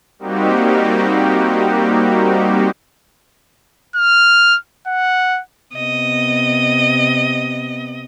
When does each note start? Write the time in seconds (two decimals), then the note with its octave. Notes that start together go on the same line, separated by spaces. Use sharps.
0.19 G3 A#3 C4 D#4 F#4 G4
3.96 F6
4.87 F#5
5.75 C3 B3 D#5